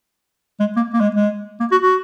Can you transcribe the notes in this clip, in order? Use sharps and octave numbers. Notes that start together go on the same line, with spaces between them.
G#3
A#3
A#3
G#3
G#3
A#3
F#4
F#4